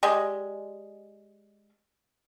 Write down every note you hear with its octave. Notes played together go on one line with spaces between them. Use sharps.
G#3 G4 D5 D#5